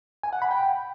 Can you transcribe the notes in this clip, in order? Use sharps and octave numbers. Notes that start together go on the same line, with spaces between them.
G#5
F#5
B5
G5